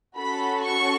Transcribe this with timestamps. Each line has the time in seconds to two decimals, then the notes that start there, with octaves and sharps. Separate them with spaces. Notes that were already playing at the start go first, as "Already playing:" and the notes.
0.18 C#4 F#4 A4 B5
0.64 C#6